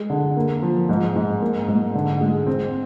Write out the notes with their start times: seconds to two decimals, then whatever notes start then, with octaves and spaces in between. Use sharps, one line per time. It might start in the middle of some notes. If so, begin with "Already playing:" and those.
Already playing: G#3
0.10 D3
0.37 A#3
0.62 F3
0.89 G#2
1.16 G#2
1.41 A#3
1.68 G#2
1.95 D3
2.21 G#3
2.47 C4